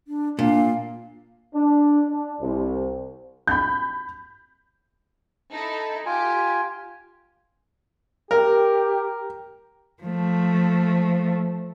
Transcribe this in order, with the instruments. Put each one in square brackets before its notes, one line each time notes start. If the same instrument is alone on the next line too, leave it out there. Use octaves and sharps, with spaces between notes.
[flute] D4
[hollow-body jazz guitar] A#2 [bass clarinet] D4 [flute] F5
[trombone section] D4
D4
C2
[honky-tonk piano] B5 G6
[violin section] D#4 E4 A4
[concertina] F4 G#5 [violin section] G4
[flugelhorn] G4 [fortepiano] A#4
[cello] F3 A3